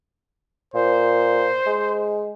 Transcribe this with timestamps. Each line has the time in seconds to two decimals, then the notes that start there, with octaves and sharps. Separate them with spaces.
0.74 A#2 C5
1.66 G#3